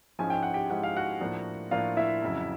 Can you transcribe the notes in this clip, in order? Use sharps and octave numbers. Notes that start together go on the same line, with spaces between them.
G#2 F3 G#3 C#4 E4 G#5
G5
F#5
G4 G5
G#2 F3 G#3 C#4 E4 F#5
F5
F#4 F#5
A2 F3 A#3 D4
A2 F3 A#3 D4 F4 F5
E4 E5
F2 C#3 F#3